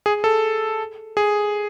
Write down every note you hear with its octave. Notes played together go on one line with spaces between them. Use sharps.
G#4
A4
G#4